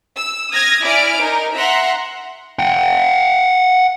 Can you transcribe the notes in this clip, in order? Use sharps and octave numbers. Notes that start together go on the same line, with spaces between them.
E6
D#6 F6 G#6 A#6
E4 D5 G#5 F6 D7
D#4 A#4
E5 F#5 A#5 C6
F#5 G5